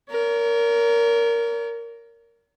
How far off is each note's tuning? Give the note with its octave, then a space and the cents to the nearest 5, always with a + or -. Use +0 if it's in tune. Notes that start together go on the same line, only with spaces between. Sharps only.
A#4 +0 C#5 +45